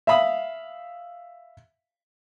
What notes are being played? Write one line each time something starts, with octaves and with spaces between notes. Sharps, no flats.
E5 F5 B5 D#6